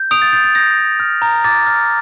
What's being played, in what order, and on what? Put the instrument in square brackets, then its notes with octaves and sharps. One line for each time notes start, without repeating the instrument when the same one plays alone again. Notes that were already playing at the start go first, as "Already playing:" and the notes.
Already playing: [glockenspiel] G6
D#6 D7 F7
A6
G6 A6
A6
D#6 G6 A#6
G6
F6
A#5
D6 A6
F6